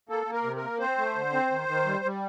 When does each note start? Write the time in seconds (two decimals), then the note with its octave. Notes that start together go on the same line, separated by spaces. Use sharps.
0.09 A#3 A4
0.26 A#3
0.33 A#4
0.44 C3
0.56 A#4
0.62 A#3
0.80 C4 C5
0.98 A3
1.15 D3
1.33 C4
1.51 D#3
1.68 D#3
1.86 G3
2.05 G3